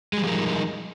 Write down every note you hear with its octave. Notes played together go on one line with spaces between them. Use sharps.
F3 G3 G#3 D#4 A#4